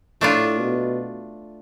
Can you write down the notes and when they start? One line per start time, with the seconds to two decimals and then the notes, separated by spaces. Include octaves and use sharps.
0.21 A2 A3 D4 F4
0.60 B2